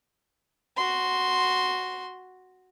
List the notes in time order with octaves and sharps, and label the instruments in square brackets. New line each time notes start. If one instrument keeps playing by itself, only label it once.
[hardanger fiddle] F#4 C6